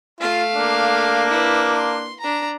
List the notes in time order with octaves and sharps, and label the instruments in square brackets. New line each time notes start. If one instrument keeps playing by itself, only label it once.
[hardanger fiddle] A3 F5 [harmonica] F4
[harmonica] A#3 D4
[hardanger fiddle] E4 B4
C6
D4 A#5